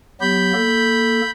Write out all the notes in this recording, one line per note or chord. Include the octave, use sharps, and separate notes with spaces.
F#3 B3 G4 B5 G6
A#3 A4